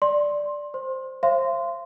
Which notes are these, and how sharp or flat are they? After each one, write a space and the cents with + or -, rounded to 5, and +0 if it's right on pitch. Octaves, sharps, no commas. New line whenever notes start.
D5 +0 C6 +20
C5 +0 C6 +25
C5 +35 F5 -40 C6 -15